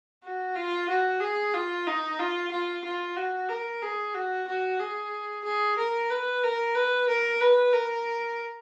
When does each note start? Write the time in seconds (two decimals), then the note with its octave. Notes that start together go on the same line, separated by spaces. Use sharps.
0.24 F#4
0.56 F4
0.89 F#4
1.20 G#4
1.54 F4
1.87 D#4
2.19 F4
2.51 F4
2.84 F4
3.16 F#4
3.49 A#4
3.82 G#4
4.14 F#4
4.47 F#4
4.79 G#4
5.44 G#4
5.77 A#4
6.10 B4
6.43 A#4
6.75 B4
7.08 A#4
7.40 B4
7.73 A#4